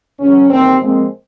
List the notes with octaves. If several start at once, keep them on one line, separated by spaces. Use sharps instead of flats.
E2 C#3 F#3 C#4
E2 C3 D#3 G3 A#3 C4
A#2 F3 G#3 C4